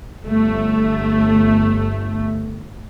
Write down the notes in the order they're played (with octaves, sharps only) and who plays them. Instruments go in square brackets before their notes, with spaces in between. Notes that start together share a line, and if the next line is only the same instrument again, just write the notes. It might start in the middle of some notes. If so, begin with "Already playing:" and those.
[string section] G1 A3